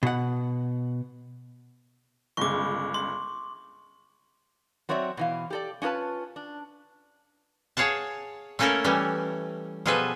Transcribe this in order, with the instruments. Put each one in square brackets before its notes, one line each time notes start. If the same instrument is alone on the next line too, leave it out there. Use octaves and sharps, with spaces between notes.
[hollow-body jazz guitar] B2 F#5
[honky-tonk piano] G1 C#2 [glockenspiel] C#6 D6
[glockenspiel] C6
[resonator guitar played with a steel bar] F#3 C4 C#5 D5 E5
B2 E3 F5
G4 A4 D5
C#4 D4 F4 B4 A5
D4
[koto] G#4 C#5 F5 F#5 A5
A3 A#3 C#4 E4 A4 A#4
E3 G3 A3 C#4
B2 F3 G3 G#4 A4 B4